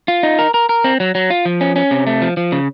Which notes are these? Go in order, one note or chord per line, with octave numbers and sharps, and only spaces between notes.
F4
D#4
A#4
A#4
A#4
C4
F#3
F#3
F4
F3
C#4
C#4
C3
A3
F3
F3
C#3